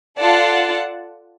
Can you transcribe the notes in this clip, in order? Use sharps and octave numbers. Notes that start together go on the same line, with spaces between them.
F4 A4 D5 F#5 A5